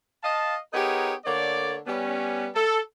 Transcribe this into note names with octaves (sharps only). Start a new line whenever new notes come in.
D#5 F5 A5
B3 D#4 G4 G#4 A#4 C#5
D3 A3 A#3 C#5 D5
G3 B3 C#4
A4